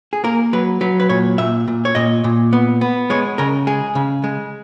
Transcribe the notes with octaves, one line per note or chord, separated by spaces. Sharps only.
G#4
A#3 A#4
F#3 B4
F#3 B4
B4
A#2 C#5
A#2 E5
A#2
C#5
A#2 D#5
A#2
B3
B3
G#3 C#5
C#3 A#4
G#3 G#4
C#3
G#3